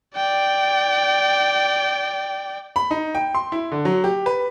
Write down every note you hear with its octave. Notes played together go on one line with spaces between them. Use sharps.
D5 G5
B5
D#4
G5
C6
E4
D3
F#3
G4
B4